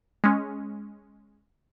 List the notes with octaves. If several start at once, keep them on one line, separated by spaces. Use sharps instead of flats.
G#3 C#4